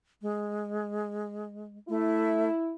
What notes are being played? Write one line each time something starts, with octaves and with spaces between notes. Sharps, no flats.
G#3
A3 E4